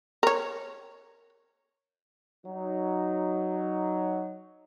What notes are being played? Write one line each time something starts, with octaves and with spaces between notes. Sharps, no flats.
A#4 C#5
F#3 D#4